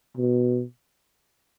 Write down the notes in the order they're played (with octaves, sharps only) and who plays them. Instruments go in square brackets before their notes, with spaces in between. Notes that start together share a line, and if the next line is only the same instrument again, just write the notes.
[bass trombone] B2